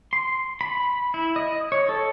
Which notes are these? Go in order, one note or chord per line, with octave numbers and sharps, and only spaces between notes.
C6
B5
E4
D#5
C#5
A4